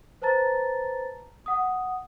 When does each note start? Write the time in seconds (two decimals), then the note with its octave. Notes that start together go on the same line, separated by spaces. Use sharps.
0.22 B4 C5 A5 A#5 A6
1.46 F#5 D#6